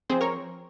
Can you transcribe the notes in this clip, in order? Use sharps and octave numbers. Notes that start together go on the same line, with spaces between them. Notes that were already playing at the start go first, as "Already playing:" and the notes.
F3 C4 G#4 C5
A#4 C#5